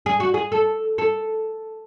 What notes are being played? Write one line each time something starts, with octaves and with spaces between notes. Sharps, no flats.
G#4
F#4
G#4
A4
A4